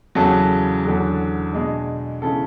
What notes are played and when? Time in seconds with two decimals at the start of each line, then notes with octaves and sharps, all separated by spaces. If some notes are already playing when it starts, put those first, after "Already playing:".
0.15 E2 C#3 F#3 A4
0.85 E2 D3 F#3
1.53 B2 G#3 D4
2.22 C#3 E3 A4